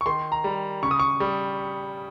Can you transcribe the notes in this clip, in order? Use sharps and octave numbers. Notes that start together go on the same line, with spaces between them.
C#6
D#3 C6
A#5
G3
C#3 C#6
D#6
C#6
G3